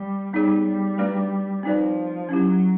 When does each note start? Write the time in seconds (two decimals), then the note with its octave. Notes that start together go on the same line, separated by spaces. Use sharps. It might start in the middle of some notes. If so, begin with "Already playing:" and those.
Already playing: G3
0.33 G3 B3 D#4 G#4 C#5
0.66 G3
0.98 A3 D4 F#4 B4 D5
1.63 F3 C4 D#4 F#4 B4 D5
2.29 F#3 C#4 E4 G4